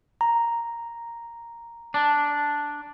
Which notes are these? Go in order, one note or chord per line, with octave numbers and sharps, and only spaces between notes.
A#5
D4